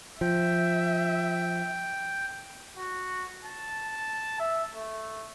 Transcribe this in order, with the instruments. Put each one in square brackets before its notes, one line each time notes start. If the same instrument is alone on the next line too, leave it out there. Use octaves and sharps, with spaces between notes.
[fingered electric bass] F3 [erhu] E5 [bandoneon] G5
[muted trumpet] F#4
A5
E5
A3